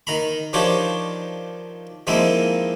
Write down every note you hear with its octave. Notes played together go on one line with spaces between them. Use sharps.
D#3 A#5 B5
D#3 F3 D4 G4 C5 C#5
D#3 F3 G#3 A#3 C4 E4